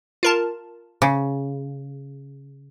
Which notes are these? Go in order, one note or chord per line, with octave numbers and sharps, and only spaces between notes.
F4 A#4 A5
C#3